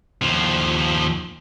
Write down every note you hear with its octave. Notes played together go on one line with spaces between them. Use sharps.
D#2 F3